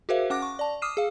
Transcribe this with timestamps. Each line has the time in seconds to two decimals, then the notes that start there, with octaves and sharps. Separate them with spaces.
0.09 F#4 G#4 A#4 C5 E5 F5
0.30 C#4 F#5 D6 F#6 A#6
0.42 C#6
0.59 D5 A5
0.82 D6 D#6 F6 C7 D#7 E7
0.97 G#4 F5